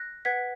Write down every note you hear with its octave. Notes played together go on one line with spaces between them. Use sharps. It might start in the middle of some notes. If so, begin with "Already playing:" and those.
Already playing: F#6 A#6
B4 F#5 G#6 B6